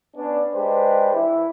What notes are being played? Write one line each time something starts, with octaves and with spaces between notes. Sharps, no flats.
B3 C#4 D4
G#3 D4 G4 B4 C5
E3 E4